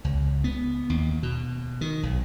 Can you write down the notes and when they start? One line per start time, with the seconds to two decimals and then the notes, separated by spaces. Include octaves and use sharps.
0.04 C#2
0.44 B3
0.90 D#2
1.23 B2
1.81 D#3
2.03 B1